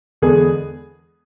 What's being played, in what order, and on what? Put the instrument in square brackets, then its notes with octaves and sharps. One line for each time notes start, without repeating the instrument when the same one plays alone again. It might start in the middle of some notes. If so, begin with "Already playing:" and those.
[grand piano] E2 D3 G#3 B3 G#4